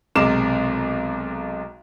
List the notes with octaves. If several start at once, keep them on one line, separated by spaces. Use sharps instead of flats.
B1 C3 G#3 A#4 D6 E7